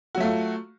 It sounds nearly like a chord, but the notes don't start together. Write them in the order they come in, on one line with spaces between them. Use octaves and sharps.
F#4 F#3 A3 F4